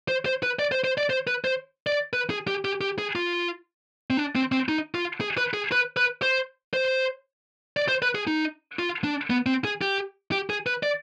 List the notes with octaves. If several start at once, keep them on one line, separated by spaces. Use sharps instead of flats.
C5
C5
B4
D5
C5
C5
D5
C5
B4
C5
D5
B4
G#4
G4
G4
G4
G#4
F4
C4
D4
C4
C4
D#4
F4
G#4
B4
G#4
B4
B4
C5
C5
D5
C5
B4
G#4
D#4
F4
D4
B3
C4
G#4
G4
G4
G#4
B4
D5